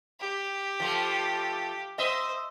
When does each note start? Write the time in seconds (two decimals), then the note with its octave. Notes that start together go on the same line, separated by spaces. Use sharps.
0.20 G4
0.80 F3 A3
1.98 C5 D#5 E5